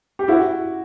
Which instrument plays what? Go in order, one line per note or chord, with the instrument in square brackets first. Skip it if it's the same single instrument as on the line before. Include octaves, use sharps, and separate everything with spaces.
[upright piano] G4
E4 F#4